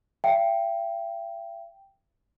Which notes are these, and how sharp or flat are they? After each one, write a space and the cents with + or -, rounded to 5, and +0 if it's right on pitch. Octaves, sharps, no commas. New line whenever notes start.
E5 +45 G5 +0